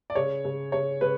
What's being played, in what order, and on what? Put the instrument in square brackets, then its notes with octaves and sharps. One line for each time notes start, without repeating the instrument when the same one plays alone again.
[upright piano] D5
C#3 C#5
C#3
C#3 C#5
C#3 B4